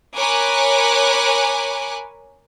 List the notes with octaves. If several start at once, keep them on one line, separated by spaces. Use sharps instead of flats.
A#4 C#5 G#5 B5 D6 F#6